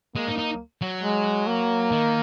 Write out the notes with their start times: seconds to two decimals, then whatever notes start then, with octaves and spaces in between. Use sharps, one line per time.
0.16 G#3 A#3
0.27 D#4
0.38 D#4
0.82 F#3
1.03 G#3
1.47 A#3
1.92 D#3